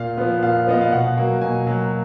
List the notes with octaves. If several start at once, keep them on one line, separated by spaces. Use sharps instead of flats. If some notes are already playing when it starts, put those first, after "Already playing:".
Already playing: A#2 F5
F3 B3
A#2 F5
F3 B3 D#5
F5
B2 F#5
F#3 A#3
B2 G#5
F#3 A#3